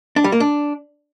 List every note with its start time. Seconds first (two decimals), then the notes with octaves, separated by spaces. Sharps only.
0.16 D4
0.24 G3
0.32 A#3
0.40 D4